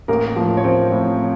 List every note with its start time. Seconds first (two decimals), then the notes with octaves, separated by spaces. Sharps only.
0.08 A1 A#3 A#4
0.36 A2 F3
0.57 C#5
0.64 A1 C4 C5
0.92 A2 F3